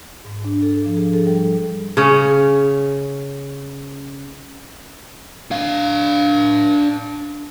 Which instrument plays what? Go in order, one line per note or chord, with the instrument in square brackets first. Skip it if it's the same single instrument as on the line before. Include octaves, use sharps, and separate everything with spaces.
[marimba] G#2
D4
A4
F3
G#4
A4
G3
[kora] C#3 C#4
[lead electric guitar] D4 F5